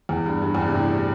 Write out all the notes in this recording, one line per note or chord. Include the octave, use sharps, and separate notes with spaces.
E2
G2
G2
E2
G2
C3
A2